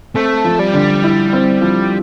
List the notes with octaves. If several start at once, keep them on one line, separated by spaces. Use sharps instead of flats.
A3 C4
F3
G3
D3
E4
C4
F3